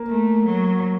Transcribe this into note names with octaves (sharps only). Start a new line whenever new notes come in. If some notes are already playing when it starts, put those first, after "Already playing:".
Already playing: A#3
A3
F#3